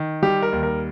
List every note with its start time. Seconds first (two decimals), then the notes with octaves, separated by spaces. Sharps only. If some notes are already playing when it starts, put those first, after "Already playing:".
Already playing: D#3
0.22 G3 G4
0.43 A#4
0.52 D#2
0.63 A#4